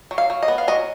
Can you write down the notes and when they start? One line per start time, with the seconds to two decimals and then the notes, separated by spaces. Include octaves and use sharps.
0.11 F#3
0.18 F5
0.30 F#3
0.43 D#5
0.48 B3
0.58 F5
0.68 F#3 D#5